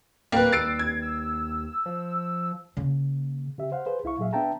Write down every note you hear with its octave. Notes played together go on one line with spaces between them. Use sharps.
D1 G3 A#3 A#4 B4
D#2 E6 A6 C7 D7
G#6
E6
F3
C#3 A#3
C#3 G4 E5
C5 F5 F#5
G#4 B4 C5
C2 E4 F5 C#6
A#2 F#3 G#4 E5 F5
B3 D4 E5 G5 A5 A#5